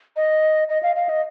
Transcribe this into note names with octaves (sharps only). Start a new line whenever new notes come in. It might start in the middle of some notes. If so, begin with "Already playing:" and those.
D#5
D#5
F5
F5
D#5